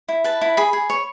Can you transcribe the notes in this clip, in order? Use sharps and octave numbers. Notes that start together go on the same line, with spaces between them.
E4
B4 A5
E4
G#4 B5
G#4
C#5